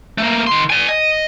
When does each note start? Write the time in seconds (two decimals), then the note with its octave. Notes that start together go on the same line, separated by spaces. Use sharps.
0.18 A3 A#3
0.47 D#3 C6
0.70 D5 G#5
0.89 D#5